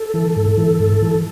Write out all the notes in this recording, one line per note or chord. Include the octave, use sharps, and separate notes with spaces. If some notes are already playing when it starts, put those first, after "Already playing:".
Already playing: A4
E3
G#2
E3
G#2
E3